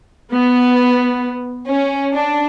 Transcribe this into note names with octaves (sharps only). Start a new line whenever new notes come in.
B3
C#4
D4